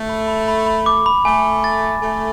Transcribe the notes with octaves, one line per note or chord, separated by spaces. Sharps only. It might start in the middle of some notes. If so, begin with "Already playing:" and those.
Already playing: A3
B5
B5
B5
B5
D6
B5
A3 G#5
G#5
A6
D6
A3 G#5